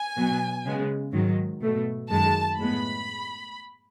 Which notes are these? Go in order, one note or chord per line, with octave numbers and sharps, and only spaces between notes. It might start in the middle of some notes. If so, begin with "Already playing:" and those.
Already playing: G#5
B2 F#3 B3
C#3 G#3 B3
G#2 D#3 F#3
B2 A3
F#2 D#3 G#3 A5
A2 G#3 B3 B5